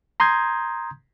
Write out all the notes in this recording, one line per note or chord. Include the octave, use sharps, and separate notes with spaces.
A#5 C6 D#6 G6 G#6